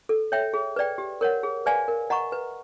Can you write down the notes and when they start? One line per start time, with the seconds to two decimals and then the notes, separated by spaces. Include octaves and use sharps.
0.09 A4
0.32 C#5 E5 G5
0.54 G#4
0.76 B4 D5 G5
0.98 G4
1.21 A#4 C#5 F#5
1.43 G#4
1.66 B4 D5 F5 G#5
1.88 A#4
2.10 D#5 F#5 A#5 C#6
2.32 B4